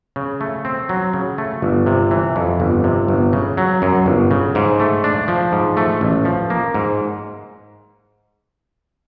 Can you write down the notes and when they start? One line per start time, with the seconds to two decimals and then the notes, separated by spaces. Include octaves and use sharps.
0.16 C#3
0.41 A3
0.65 C4
0.89 F#3
1.13 C#3
1.38 A3
1.62 G1
1.86 C3
2.11 E3
2.36 F2
2.60 G1
2.84 C3
3.08 G1
3.33 C#3
3.57 F#3
3.82 F#2
4.06 G1
4.31 C#3
4.55 G#2
4.80 A3
5.04 D4
5.28 F3
5.52 G#2
5.77 A3
6.01 A1
6.25 F3
6.50 A#3
6.74 G#2